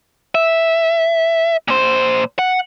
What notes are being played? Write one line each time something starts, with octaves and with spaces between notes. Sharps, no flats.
E5
A#2 C5
F#5